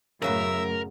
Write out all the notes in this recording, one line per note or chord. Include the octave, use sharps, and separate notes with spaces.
F#2 A2 C#3 F#3 B3 A#4 E5 E6